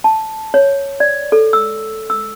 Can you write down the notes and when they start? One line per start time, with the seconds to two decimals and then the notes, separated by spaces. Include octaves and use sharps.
0.04 A5
0.54 C#5
1.00 D5
1.32 A4
1.53 E6
2.10 E6